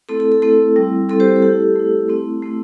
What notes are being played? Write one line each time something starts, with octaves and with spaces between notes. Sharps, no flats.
A3 C4 E4 A4
A4
A4
A3 C4 E4 A4
G3 C4 E4
G3 C4 E4 A4
G4 C5
A4
A3 E4 G4
A3 E4
A3 C4 E4
A3 C4 E4